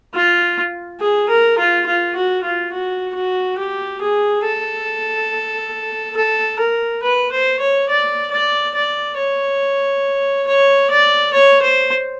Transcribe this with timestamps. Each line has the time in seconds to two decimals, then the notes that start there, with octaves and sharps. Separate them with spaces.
0.14 F4
1.00 G#4
1.29 A#4
1.58 F4
1.86 F4
2.15 F#4
2.43 F4
2.72 F#4
3.15 F#4
3.58 G4
4.01 G#4
4.44 A4
6.16 A4
6.59 A#4
7.03 B4
7.32 C5
7.60 C#5
7.89 D5
8.31 D5
8.75 D5
9.17 C#5
10.47 C#5
10.90 D5
11.33 C#5
11.62 C5